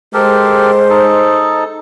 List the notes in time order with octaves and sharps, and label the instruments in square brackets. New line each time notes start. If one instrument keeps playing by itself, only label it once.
[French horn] G#3 [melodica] G4 A4 A#4 [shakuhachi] C5
[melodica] D#4 A4